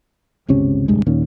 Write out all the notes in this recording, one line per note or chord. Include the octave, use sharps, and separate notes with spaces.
G1 C#2 C3 C#4
D1 C2 G2 G#3
D#2 A#2 D#3 C#4